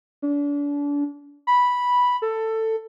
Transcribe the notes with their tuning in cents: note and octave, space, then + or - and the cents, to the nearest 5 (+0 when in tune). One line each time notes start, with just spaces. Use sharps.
D4 -35
B5 -5
A4 +15